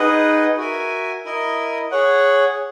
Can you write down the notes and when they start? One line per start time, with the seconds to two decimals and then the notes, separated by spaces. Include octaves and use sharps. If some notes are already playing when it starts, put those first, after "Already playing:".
Already playing: D#4 G#4 B4 D#5 F#5
0.57 F#4 A#4 E5 G#5
1.25 E4 A#4 D#5
1.91 G#4 C#5 F#5